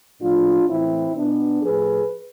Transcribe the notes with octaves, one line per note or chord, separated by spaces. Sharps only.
A2 F3 D4 F4
A2 E3 C4 E4
B2 B3 D4
A2 F3 G#4 B4